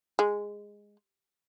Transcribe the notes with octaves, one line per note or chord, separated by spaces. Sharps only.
G#3